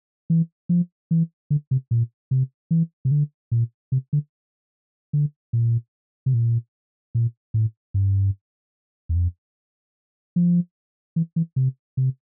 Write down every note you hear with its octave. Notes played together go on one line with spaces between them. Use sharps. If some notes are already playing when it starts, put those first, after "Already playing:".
E3
F3
E3
D3
C3
A#2
C3
E3
C3
D3
A#2
C3
D3
D3
A#2
C3
A#2
A#2
A2
G2
E2
F2
F3
E3
E3
C3
C3